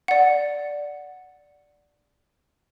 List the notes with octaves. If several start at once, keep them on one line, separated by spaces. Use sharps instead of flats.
D5 F#5